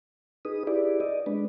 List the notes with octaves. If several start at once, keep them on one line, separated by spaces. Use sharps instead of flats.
D#4 G#4 B4 D#6
E4 G4 G#4 B4 D5
D5 D#5
G#3 D4 B4